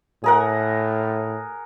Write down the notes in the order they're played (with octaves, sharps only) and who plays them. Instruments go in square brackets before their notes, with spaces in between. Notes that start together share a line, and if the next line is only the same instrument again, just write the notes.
[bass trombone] A2 [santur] G#4 A#4 F#5